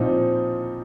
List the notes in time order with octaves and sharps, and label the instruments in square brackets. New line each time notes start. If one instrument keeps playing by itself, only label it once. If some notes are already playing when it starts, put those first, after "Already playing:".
Already playing: [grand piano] A#2 F3 C4 D#4